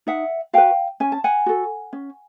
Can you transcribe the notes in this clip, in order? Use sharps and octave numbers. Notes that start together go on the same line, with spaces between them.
D#4 E5 F#5
F#4 B4 F5 G5
C#4 G#5
A5
F#5 G#5
F#4 A4
C#4